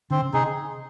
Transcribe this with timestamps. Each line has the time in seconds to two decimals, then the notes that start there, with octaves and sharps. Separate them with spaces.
0.11 D3 C4
0.22 C#3
0.33 C3 D#4 G#4